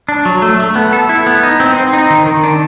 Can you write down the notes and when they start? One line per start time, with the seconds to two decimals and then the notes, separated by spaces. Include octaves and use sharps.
0.09 D4
0.25 F#3
0.42 A3
0.60 A3
0.76 B3
0.93 A4
1.09 E4
1.27 B3
1.43 D#4
1.60 C4
1.76 C4
1.93 D#4
2.10 D#3
2.27 D#3
2.43 D4